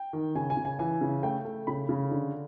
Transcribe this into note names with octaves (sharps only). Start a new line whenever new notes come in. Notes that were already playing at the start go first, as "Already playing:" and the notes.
Already playing: G5
D#3
C#3 G#5
G#5
C#3
G#5
E3 G#5
C#3
A3 G5
A3
C#3 B5
C#3
D3